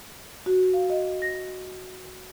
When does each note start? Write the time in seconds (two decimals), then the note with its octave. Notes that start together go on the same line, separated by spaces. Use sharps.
0.46 F#4
0.73 F5
0.90 D#5
1.22 A#6